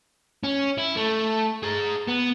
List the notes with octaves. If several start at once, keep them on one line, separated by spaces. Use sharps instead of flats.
C#4
E4
A3
G#4 A#5
B3